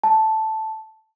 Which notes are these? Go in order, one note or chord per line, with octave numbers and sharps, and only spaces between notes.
A5